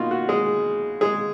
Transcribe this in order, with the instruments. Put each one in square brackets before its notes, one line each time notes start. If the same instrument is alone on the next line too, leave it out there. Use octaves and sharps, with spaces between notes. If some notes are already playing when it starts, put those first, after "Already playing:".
Already playing: [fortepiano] B2 A#3 D#4 F4 F#4
F#4
G#3 G#4
G#3 G#4